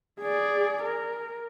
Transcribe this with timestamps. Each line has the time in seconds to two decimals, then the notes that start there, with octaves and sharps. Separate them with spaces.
0.21 G#4 D5
0.82 A#4